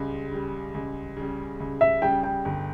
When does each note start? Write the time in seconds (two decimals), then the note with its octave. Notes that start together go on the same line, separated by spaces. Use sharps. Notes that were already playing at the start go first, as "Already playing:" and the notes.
Already playing: C#2 C#3 G3
0.32 C#3 G3
0.74 C#2
1.17 C#3 G3
1.60 C#2
1.81 E5
2.02 C#3 G3 G5
2.23 G5
2.45 G1